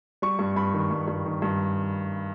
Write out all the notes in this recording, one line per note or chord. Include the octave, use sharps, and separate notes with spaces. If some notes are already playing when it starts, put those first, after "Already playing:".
G3 C#6
G2
G2 B5
D#3
G2
G2
D#3
G2